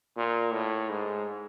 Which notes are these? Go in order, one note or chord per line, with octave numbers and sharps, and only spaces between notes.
A#2
A2
G#2